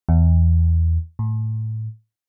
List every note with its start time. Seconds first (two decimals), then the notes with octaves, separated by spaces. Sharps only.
0.09 E2
1.19 A2